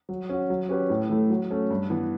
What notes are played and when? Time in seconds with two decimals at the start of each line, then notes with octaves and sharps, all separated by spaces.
0.09 F#3
0.29 C#4 F#4
0.50 F#3
0.69 C#4 G4 B4
0.90 A2
1.10 E3 A3
1.30 F#3
1.51 A3 C#4
1.70 G2
1.90 E3 B3